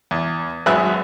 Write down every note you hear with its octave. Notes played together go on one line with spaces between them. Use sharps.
E2
G#1 F#2 G#4 B4 E5 F#6